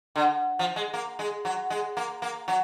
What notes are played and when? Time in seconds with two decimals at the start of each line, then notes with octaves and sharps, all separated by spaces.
0.16 D3
0.59 F3
0.76 G#3
0.94 A#3
1.19 G#3
1.45 F#3
1.70 G#3
1.97 A#3
2.22 A#3
2.48 F#3